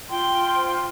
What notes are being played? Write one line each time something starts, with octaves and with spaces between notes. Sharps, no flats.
F4 G5 C6
F4
C5